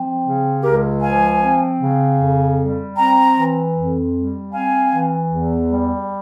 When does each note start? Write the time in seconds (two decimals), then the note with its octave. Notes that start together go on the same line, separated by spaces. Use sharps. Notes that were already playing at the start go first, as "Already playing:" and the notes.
Already playing: F3 C4
0.24 C#3
0.62 C#2 G4 A#4
1.01 F3 F5 G#5
1.40 C4
1.79 C#3
2.18 F2
2.58 G3
2.96 C4 G5 A#5
3.35 E3
3.74 F2
4.13 G3
4.53 C4 F5 G#5
4.92 E3
5.30 E2
5.70 G3